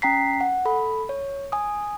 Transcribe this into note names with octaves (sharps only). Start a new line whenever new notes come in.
C#4 G5 A#5 B6 C7
F#5
A4 B5
C#5
G#5 D#6